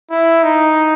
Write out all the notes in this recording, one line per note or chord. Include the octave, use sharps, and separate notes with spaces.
E4
D#4